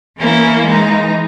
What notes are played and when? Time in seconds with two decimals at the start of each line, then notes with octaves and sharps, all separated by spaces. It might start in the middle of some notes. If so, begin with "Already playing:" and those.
0.18 E3 A#3 C#4 E4
0.64 E3 G#3 D#4